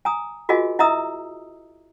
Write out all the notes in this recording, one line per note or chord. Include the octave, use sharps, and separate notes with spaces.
G#5 A#5 D#6
F4 F#4 G#4 A#4 D#5 G#5
E4 D#5 E5 A#5 D#6 E6